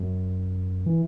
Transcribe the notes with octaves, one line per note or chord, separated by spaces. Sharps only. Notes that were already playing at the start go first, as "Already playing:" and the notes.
Already playing: F#2
E3